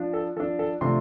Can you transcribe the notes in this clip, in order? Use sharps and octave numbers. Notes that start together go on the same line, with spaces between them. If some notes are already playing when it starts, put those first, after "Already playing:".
Already playing: F3 D4
A4
F3 D4 A4
A4
C3 F3 A3 D4 C6